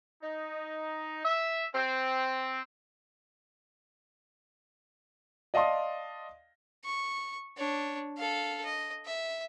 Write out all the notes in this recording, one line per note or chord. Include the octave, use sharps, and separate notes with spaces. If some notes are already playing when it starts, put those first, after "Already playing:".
D#4
E5
C4
D5 D#5 F5 A5 C6 D#6
C#6
D4 C#5
A4 F5
D#5
E5